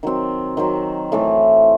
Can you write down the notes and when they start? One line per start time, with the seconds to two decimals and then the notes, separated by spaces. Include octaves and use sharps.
0.03 D#3 F#3 C4
0.57 D#3 F#3 C4
1.12 A2 E3 A3